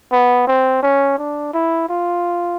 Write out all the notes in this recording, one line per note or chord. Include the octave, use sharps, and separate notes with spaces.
B3
C4
C#4
D4
E4
F4